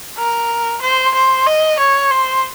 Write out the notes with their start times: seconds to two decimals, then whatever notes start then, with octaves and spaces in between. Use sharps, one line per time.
0.18 A#4
0.82 C5
1.15 C5
1.47 D#5
1.79 C#5
2.11 C5